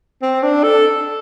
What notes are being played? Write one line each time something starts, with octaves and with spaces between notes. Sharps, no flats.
C4
D4
A4